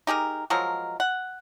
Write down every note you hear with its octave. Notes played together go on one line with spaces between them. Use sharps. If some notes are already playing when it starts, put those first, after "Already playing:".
D#4 G4 G#4 A#4
F3 F#3 G#3 A#4
F#5